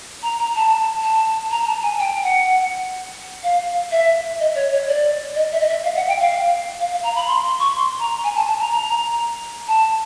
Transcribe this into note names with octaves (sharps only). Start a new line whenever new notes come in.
A#5
A#5
A5
A5
A#5
A#5
A5
G#5
G5
F#5
F5
E5
D#5
C#5
C#5
D5
D#5
E5
D#5
E5
F5
F#5
G5
F5
F5
F5
A#5
B5
C6
C6
C#6
C6
A#5
G#5
A5
A5
A#5
A#5
A5